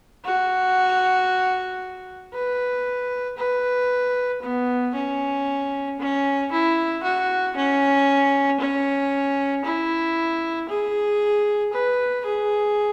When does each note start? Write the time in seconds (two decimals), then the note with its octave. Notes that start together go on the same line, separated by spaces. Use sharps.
0.25 F#4
2.34 B4
3.38 B4
4.42 B3
4.95 C#4
6.00 C#4
6.52 E4
7.04 F#4
7.56 C#4
8.60 C#4
9.65 E4
10.69 G#4
11.73 B4
12.26 G#4